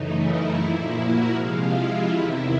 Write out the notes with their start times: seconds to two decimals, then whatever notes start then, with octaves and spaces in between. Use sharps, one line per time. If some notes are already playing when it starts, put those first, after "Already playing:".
Already playing: F#2 C#3 E3 A3 D#4
0.16 E4
0.55 A#2 F3 A#3
0.94 F#4
1.32 C3 F3 G#3 F4
1.70 E4
2.09 E2 C3 D#3